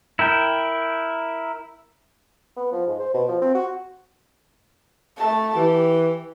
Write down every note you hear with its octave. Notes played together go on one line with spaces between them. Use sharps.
E4 A#4 G5
B3
F3
G#2
C5
B2
F3
C4
F#4
A3 A5
E3 G4